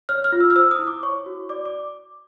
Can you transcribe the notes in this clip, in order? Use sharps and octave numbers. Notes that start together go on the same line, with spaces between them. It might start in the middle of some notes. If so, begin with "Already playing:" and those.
C#5 F6
F6
F4
E6
F6
C5 E6
D#6
E4
D6
C#5 C#6
F#4
D5 D6
D6